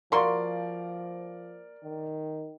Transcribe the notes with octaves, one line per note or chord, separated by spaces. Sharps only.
F3 A#3 F#4 A#4 D5 C6
D#3